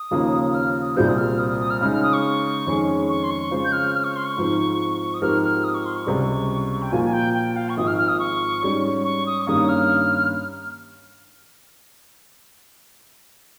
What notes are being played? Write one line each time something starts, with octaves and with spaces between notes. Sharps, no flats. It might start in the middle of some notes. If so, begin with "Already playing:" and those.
Already playing: D#6
D#2 C#3 F3 A#3
D#6
F6
D#6
C2 A#2 G3 C4 G6
D#6
F6
D#6
D#6
D#6
F6
C#3 G#3 D#4 G#4 F6
F6
D#6
C#6
F2 D#3 G#3 C#4 G#4
C#6
C6
C#6
C#3 G#3 C4 F4 C5
G6
F6
F6
C#6
C6
C#6
G#2 F3 C4
D#6
G#2 F3 C4 G4 A#4 F6
F6
D#6
C#6
C6
C#6
C#2 C3 G3
G5
A#2 F3 A#3 F4 G#5
G#5
G5
G5
F5
C#6
G#1 G#2 F3 D#6
F6
F6
D#6
C#6
G#2 G3 C#4
C#6
D#6
C#6
G2 D#3 A#3 C#4 D#6
F6